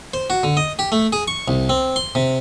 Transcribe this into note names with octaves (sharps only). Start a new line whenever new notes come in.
C5
F#4
D3
D#5
G4
A3
G#4
C#6
C2
C4
C6
C3